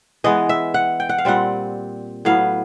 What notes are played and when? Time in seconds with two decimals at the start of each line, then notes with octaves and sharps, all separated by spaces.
0.24 E3 G#3 B3 D#5
0.49 E5
0.74 F#5
1.00 G5
1.09 F#5
1.18 F5
1.25 A#2 G3 C4 F#5
2.25 A2 F#3 B3 F5